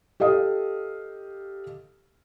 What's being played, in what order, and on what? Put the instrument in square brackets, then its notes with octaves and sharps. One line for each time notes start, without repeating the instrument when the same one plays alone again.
[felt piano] G4 A4 D#5 F5 D#6